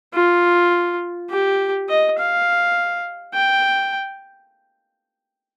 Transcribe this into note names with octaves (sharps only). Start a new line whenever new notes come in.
F4
G4
D#5
F5
G5